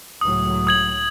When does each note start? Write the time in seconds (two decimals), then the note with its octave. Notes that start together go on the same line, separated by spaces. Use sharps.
0.21 C#2 A2 F#3 D#6
0.67 D#6 G#6 F#7